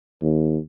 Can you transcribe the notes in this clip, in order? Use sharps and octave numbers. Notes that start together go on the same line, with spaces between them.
D#2